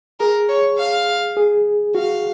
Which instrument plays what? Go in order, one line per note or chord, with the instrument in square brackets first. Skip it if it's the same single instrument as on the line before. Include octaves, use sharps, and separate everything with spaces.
[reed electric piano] G#4 [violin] A#4
[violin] C#5
F5
[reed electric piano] G#4
[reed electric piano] F#4 [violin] F5